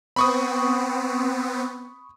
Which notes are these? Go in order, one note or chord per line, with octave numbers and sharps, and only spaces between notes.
B3 C4 B5 C#6 D#6